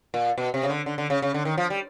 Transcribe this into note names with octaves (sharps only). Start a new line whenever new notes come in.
A#2
B2
C3
C#3
D3
D3
D3
C#3
C#3
D3
D#3
F3
G3